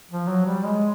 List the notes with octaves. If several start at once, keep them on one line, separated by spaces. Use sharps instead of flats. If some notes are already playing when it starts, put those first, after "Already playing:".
F3
F#3
G3
G#3